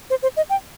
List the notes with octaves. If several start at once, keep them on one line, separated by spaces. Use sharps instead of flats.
C5
C5
D#5
G5